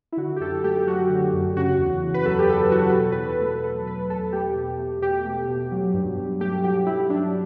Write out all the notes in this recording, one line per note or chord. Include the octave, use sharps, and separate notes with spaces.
E4
D3 F#4
G4
F#2 A4
A4
A3 G4
F#3 F#4
D3
F#2
C#3 F#4
E2
E2
B4
F#3 A4
G4
C#3 A4
E2 F#4
B4
B2 A4
B4
E2
A4
A3
B4
F#3 A4
B2 B4
E2 A4
A3 G4
B2
A3
B2 G4
A3
B2
F#3
G2
G2
A3 G4
F#3 G4
G2 E4
F#3 D4